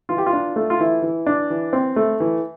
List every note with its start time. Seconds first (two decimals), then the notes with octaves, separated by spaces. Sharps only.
0.09 E3 F4
0.18 G4
0.26 F4
0.33 D4
0.56 A3
0.70 F4
0.80 E3 E4
1.02 E3
1.26 D4
1.50 E3
1.73 C4
1.96 A3
2.20 E3